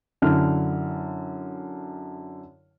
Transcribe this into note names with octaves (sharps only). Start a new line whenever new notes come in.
F#2 D3 E4 F6